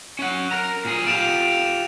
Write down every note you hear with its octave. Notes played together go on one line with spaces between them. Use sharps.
C#4 F#5
A#4 A#5
A#2 G#4
F4 G4 D7 E7 F7